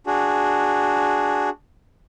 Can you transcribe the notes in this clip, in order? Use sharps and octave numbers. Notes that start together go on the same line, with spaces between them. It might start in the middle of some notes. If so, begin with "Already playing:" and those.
D4 F#4 G#4